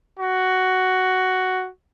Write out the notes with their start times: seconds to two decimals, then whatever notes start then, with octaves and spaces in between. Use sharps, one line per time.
0.19 F#4